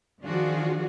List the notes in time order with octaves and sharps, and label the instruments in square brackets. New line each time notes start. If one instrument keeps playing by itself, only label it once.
[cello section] D#3 F3 D4 F4 F#4 G#4